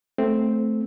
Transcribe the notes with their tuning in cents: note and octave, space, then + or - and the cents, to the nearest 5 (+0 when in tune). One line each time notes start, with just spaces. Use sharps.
A3 +0 C4 +0